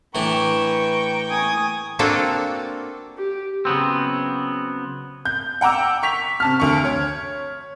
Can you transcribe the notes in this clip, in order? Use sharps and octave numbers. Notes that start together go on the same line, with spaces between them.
A2 E3 D4 B4 G5 A#5 C#6
G#5 D#6
A#3 C4 D4 F4 F#4 A4
G4
C#3 F#3 B3 C4
G6
F#5 G5 A#5 D6 E6
C#6 B6 F7
C3 A5 F6
D2 C#6
C#5